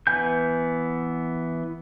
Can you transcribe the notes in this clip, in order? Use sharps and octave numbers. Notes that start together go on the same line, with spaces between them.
E3 B3 G#5 G6